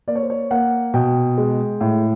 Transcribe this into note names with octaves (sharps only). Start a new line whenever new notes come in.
A#3 D5
C#5
C5
C#5
A#3 F#5
B2 G5
G#3
A2